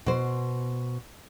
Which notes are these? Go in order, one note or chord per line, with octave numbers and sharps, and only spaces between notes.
B2 C5